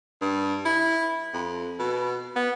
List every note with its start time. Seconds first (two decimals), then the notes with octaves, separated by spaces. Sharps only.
0.21 G2
0.65 E4
1.33 F2
1.79 B2
2.36 B3